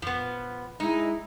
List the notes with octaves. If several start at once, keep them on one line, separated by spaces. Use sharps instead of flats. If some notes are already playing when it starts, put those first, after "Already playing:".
F2 A#2 F3 B3
G#3 D#4 E4